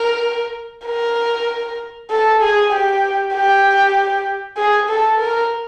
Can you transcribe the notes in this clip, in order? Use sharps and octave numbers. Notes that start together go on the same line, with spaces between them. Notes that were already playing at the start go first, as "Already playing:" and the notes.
Already playing: A#4
A#4
A4
G#4
G4
G4
G#4
A4
A#4